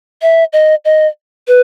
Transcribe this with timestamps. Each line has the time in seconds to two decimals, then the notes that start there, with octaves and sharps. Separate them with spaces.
0.22 E5
0.53 D#5
0.85 D#5
1.48 B4